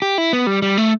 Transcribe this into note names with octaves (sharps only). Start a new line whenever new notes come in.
G4
E4
B3
G3
G3
A3